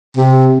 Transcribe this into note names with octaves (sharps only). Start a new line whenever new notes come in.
C3